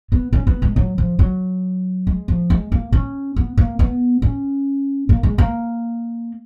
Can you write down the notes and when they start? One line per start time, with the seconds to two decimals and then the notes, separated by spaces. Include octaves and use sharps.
0.12 B3
0.33 C#4
0.47 B3
0.62 G#3
0.76 F#3
0.98 F3
1.19 F#3
2.07 G#3
2.28 F3
2.50 G#3
2.72 A#3
2.93 C#4
3.36 B3
3.58 A#3
3.79 B3
4.22 C#4
5.09 A#3
5.23 G#3
5.38 A#3